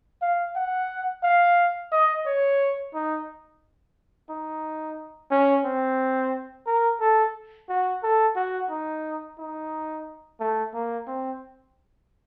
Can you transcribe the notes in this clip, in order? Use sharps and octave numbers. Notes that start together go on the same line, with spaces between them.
F5
F#5
F5
D#5
C#5
D#4
D#4
C#4
C4
A#4
A4
F#4
A4
F#4
D#4
D#4
A3
A#3
C4